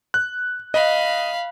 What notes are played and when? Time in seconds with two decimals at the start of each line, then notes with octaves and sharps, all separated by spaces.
0.14 F#6
0.74 D#5 F5 B5